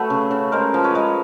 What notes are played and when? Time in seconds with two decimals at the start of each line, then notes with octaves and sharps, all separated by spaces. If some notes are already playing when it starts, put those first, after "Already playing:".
Already playing: F#3 A3 A4 B4
0.10 C#3
0.31 C#3
0.52 G#3 A#4 C5
0.74 F3
0.84 B4 C#5
0.95 G#3